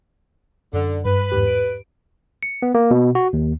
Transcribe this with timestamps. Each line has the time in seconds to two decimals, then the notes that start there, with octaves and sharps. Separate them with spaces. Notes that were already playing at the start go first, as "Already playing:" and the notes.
0.73 F#2 D3
1.05 G2 B4
1.32 E2 G#2 G4
1.47 D7
2.43 C#7
2.62 B3
2.75 A#3
2.91 B2
3.15 F#4
3.33 D#2